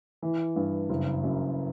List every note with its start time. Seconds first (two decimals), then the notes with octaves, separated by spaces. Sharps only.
0.23 E3
0.56 G2
0.90 F#1
1.23 F#2